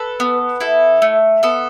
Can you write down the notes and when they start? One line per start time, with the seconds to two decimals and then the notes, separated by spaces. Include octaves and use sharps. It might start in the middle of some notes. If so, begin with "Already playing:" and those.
Already playing: A4 B4
0.20 B3
0.61 E4 A4
1.02 A3
1.43 B3 A4